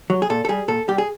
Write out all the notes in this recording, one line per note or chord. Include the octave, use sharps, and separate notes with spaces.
F#3
G#4
A#2 A4
A4
G3 G#4
A#2 A4
G3 G4
G#4